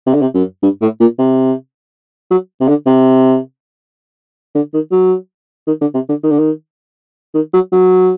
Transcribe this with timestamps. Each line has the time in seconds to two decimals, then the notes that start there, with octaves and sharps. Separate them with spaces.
0.06 C3
0.14 D3
0.21 C3
0.34 F#2
0.63 G2
0.81 A2
1.00 A#2
1.19 C3
2.31 F#3
2.61 C3
2.68 D3
2.86 C3
4.55 D3
4.74 D#3
4.92 F#3
5.67 D#3
5.81 D3
5.94 C3
6.09 D3
6.23 D#3
6.31 D3
6.39 D#3
7.35 D#3
7.53 F#3
7.72 F#3